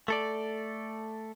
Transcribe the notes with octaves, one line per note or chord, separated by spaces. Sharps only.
A3 A4 D5